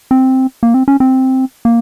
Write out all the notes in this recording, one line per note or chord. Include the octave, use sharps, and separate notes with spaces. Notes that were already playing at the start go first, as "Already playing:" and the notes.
C4
A#3
C4
C#4
C4
A#3